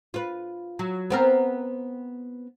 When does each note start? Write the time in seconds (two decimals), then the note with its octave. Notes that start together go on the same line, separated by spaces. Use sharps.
0.14 F4 B4
0.79 F#3
1.10 B3 C4 A#4